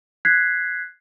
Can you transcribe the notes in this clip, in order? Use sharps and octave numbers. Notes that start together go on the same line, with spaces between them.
F#6 G#6 B6 C7